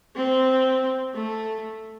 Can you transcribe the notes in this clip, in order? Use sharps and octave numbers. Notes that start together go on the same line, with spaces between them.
C4
A3